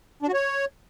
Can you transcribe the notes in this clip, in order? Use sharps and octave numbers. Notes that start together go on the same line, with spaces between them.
D4
F#4
C#5